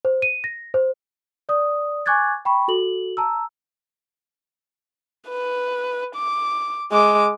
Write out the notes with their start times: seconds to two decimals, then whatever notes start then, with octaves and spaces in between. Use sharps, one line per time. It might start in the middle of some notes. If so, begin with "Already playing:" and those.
0.05 C5
0.22 D#7
0.44 A#6
0.74 C5
1.49 D5 D#6
2.06 G#5 C#6 D6 F#6 G#6 A6
2.45 G5 B5 C#6
2.68 F#4 A4 F#7
3.17 A5 A#5 E6
5.28 B4
6.15 D6
6.92 G#3 D6